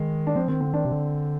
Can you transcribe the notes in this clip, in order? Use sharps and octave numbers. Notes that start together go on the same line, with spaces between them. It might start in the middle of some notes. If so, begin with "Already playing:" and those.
Already playing: D#3 G#3
D4
F3 C4
D#3 C4
D3 C4
D#3 D4
C3
D3